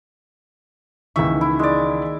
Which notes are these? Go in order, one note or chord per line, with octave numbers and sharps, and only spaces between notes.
C#2 D#3 E3 A#3 E5 C#6
E4
G#3 D5